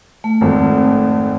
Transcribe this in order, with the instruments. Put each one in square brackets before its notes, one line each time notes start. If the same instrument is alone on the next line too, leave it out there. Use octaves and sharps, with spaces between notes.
[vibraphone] A3
[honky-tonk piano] G#1 F2